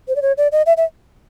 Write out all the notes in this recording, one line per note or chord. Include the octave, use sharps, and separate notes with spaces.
C5
D5
C#5
D5
D#5
E5
E5